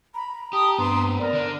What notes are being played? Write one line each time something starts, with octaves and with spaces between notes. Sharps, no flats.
A#5 B5
G4 A5 D#6
G2 B3 C4 C6
A#4 D5
D3 D4